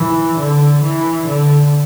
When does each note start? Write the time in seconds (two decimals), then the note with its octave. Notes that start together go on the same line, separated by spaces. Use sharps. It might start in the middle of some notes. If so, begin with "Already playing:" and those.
Already playing: E3
0.38 D3
0.82 E3
1.26 D3